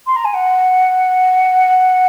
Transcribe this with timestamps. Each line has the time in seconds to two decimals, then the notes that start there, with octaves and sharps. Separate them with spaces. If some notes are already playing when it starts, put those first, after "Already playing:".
0.07 C6
0.16 A#5
0.25 G#5
0.34 F#5